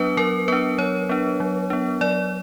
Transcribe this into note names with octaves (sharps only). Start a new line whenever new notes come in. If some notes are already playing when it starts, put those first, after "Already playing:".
Already playing: F#3 B3 D4 B4
F#3 A#4
B3 D4 B4
F#3 C#5
B3 D4
F#3
B3 D4
F#3 D5